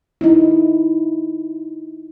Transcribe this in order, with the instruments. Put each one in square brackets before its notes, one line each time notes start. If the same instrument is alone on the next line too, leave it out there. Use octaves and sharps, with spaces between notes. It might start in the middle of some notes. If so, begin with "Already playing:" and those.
[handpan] D#4 E4